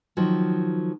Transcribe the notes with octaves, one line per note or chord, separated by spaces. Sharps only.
D#3 F3 F#3